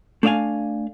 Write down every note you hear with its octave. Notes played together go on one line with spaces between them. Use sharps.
A3 D4 D5 E5 F5 G#5